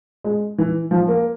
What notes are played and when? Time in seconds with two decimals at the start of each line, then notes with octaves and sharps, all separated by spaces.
0.24 G#3
0.58 E3
0.91 F3
1.08 A#3